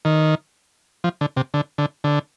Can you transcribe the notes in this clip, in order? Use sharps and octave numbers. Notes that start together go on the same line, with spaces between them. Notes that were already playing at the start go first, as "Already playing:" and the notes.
D#3
F3
D3
C3
D3
D3
D3